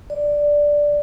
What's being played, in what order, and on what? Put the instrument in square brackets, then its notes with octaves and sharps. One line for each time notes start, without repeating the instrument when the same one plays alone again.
[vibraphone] D5